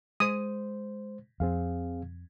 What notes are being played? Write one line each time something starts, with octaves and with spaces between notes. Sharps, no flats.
G#3 C5 D#6
F2 C4 G#4 F5